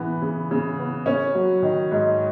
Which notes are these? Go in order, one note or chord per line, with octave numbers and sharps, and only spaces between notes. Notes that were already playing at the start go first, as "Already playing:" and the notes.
Already playing: C#3 E3 B3
C#3
C#3
B3
C#4
F#3
D#3
G#2